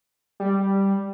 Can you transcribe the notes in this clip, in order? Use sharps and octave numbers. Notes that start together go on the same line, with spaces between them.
G3